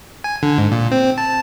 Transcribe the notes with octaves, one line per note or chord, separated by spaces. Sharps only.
G#5
D3
G#2
A#2
C4
A5